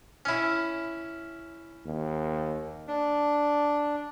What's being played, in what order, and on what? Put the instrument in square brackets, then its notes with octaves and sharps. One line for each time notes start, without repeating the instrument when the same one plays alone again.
[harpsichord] C#4 E4
[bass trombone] D#2
[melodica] D4